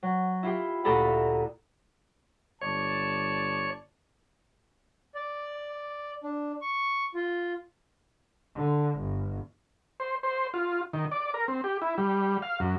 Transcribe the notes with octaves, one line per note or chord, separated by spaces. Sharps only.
F#3
E4 F4 G4
D2 A#2 G4 A4 A#5 B5
G1 C#5 D5 A5
D5
D4
C#6
F4
D3
G1
C5
C5
F4
D#3
D5
A#4
C4
G4
E4
G3
F5
F#2